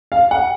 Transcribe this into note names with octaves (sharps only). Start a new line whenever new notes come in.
F5
F#5